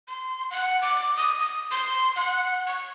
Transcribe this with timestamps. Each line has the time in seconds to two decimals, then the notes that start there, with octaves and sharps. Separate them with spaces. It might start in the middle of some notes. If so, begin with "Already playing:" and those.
0.08 C6
0.51 F#5
0.82 D6
1.16 D#6
1.41 D#6
1.71 C6
2.16 F#5
2.67 C#6